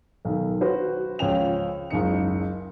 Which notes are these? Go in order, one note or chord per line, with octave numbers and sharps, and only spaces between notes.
B1 D#3
F#4 B4 C5
C#2 F3 C#5 G5 F7
F#1 C#2 D#4 C#7